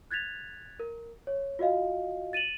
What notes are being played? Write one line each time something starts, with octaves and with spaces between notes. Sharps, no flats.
F#6 G#6 A6 B6 F7
A#4
C#5
F4 F#4 D#5 F5
A6 D#7 E7 F#7